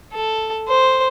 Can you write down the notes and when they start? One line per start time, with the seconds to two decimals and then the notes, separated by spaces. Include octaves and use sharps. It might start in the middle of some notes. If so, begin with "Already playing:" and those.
0.13 A4
0.68 C5